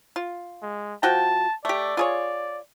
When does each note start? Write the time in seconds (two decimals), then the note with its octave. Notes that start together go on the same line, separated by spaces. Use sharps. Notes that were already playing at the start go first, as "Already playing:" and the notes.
0.16 F4
0.63 G#3
1.03 F3 F#4 G5 A5
1.65 A3 G4 D5
1.97 F4 G#4 C#5